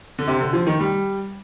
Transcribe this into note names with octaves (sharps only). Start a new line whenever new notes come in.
D3
C3
D3
F3
D#3
G3